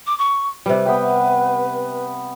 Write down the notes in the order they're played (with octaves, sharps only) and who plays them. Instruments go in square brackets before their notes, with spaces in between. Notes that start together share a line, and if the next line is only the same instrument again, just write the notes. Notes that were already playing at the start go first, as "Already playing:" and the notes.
[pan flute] D6
C#6
[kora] C3 G3 [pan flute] B4
[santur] B3 E5 G5